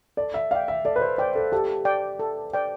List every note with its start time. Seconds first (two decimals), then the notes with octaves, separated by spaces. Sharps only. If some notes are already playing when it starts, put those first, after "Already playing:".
0.17 A4 D5
0.34 E5
0.51 D5 F5 G5
0.68 E5
0.85 A4 D5
0.96 B4
1.01 C5
1.18 C5 D5 G5
1.35 A4
1.52 G4 A4
1.85 D5 G5
2.19 A4
2.53 D5 G5